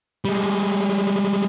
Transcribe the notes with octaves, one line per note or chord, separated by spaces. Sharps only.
G3 G#3